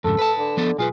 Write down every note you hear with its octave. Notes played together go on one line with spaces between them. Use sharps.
F2 G#2 C#3 A4
B4 A5
D3
F3 B3 A4
B1 F4 G#4 B4